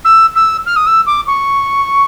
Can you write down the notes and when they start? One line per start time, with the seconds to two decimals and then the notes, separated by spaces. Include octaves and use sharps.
0.05 E6
0.36 E6
0.66 F6
0.76 D#6
0.87 E6
1.07 D6
1.27 C#6